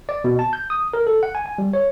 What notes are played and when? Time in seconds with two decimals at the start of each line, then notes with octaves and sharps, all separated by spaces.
0.09 D5
0.24 B2
0.39 A5
0.53 G6
0.70 D#6
0.93 A#4
1.07 A4
1.23 F#5
1.35 G#5
1.46 G#5
1.58 G3
1.73 C#5